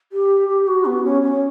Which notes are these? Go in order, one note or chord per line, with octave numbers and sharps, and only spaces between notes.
G4
G4
F#4
B3
C#4
C#4